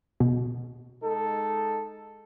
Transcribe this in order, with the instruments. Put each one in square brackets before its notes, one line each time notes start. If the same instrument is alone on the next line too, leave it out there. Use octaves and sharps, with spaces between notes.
[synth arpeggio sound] B2
[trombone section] G#3 D#4 A4